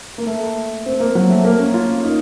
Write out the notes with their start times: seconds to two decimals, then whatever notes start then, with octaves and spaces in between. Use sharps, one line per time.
0.18 A#3
0.27 A3
0.86 C4
1.00 A#3
1.15 F#3
1.30 A3
1.45 A#3
1.59 C#4
1.74 F4
2.03 D#4